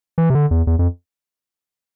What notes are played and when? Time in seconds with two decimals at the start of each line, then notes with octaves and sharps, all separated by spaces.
0.18 E3
0.30 C3
0.35 D3
0.51 E2
0.67 E2
0.79 F2